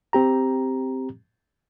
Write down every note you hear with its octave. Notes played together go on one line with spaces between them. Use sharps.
C4 G4 A#5